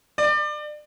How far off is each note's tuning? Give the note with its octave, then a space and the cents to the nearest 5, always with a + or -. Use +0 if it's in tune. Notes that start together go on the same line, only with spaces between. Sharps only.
D5 +30